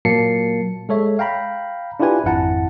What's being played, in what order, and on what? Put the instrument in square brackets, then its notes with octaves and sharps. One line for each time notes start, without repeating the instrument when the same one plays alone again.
[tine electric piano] A#2 F#3 A#3 A5 C7 C#7
G#3 A4 C#5 E5
F5 G5 A#5 B5
D4 E4 F4 G4 B4 G#5
G#1 F2 E4 F#5 A5 A#5